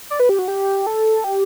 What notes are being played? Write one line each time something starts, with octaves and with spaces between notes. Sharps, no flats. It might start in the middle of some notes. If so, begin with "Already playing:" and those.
D5
B4
G4
F#4
G4
A4
G4